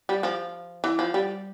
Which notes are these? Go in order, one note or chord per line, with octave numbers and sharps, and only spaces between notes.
G3
F3
E3
F3
G3